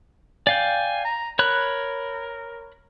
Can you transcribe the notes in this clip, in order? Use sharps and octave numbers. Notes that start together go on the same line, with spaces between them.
D5 F5 G5 G#5
A#5
A#4 C#5 B5 F#6